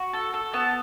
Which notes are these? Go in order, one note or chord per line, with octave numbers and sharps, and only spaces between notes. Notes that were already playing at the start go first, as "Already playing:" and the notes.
Already playing: F#4
A4
A4
B3 A5